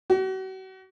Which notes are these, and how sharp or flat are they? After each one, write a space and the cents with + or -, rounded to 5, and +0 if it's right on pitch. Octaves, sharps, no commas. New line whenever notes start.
F#4 +40